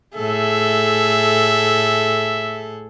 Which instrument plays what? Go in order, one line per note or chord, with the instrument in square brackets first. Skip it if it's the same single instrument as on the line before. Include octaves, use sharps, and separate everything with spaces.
[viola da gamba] A2 G#4 A4 [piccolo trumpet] E5